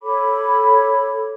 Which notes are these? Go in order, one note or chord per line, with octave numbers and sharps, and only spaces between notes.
A4 C#5 B5 D6